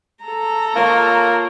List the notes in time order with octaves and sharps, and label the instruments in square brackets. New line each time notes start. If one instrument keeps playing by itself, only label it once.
[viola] A4 A#5
[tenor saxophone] A#3 [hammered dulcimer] F4 C#5 D#5